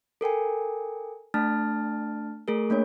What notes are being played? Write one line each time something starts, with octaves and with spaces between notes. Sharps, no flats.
A4 A#4 G5 G#5
A3 D4 A5 F6 A6
A3 G#4 A#4
A3 A#3 D4 C#5